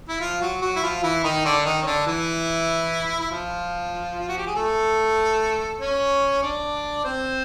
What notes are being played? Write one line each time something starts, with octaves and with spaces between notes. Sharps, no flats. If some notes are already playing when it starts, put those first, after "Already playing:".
E4
F3 F4
F#3 F#4
F#3 F#4
E4
F3 F4
E3 E4
D#3 D#4
D3 D4
D#3 D#4
C#4
D3 D4
E3 E4
E4
F3 F4
F4
F#4
G4
G#4
A3 A4
C#4 C#5
D4 D5
C4 C5